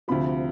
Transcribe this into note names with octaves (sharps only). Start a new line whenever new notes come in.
D2 C3 F3 B5